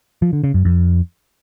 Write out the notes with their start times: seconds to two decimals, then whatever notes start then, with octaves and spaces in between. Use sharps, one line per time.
0.22 F3
0.33 D3
0.44 C#3
0.54 F#2
0.65 F2